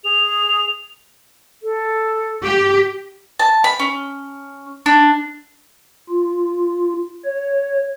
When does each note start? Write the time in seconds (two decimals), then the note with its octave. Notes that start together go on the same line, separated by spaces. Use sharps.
0.03 G#4 F7
1.63 A4
2.43 G4
3.39 A5
3.64 B5
3.79 C#4
4.86 D4
6.10 F4
7.25 C#5